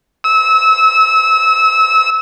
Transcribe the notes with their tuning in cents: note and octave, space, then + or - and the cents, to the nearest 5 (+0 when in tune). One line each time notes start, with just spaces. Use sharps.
E6 -25